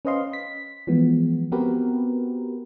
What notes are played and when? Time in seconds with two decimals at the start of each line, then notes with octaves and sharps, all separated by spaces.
0.05 C#4 B4 C5 D#5 F5 C6
0.33 B6
0.87 E3 F3 G#3 B3
1.52 B3 C4 F#4 G4 A#4 B4